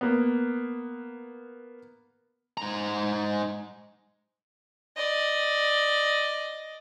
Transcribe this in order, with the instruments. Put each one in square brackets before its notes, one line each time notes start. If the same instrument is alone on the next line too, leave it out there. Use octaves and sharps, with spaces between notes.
[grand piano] A#3 B3
[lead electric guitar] G#2 A#5
[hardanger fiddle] D5 D#5